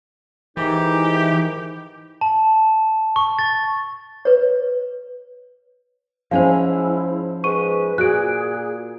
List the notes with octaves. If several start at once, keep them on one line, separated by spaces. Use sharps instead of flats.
G#2 D#3 E3 D#4 G4
A5
C#6
A6
B4 C#5
G#2 F3 C#4 E4 C5 F5
G#2 B4 C#6 D#7
A#2 F#4 G#4 F#6 D7